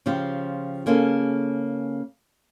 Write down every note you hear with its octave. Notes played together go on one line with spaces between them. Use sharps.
C#3 F3 F4 G4
C#3 A#3 C#4 G#4 A4